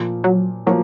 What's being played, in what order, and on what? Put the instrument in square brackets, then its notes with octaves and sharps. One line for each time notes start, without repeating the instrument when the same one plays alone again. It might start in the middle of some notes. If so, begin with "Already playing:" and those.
Already playing: [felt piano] A#2 F3 A#3
[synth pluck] F#3
[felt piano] F3 A#3 [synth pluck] F#3